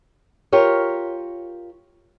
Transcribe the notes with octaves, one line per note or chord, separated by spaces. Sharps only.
F4 G4 A#4 C#5